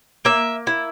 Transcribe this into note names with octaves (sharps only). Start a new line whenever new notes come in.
A#3 E5
E4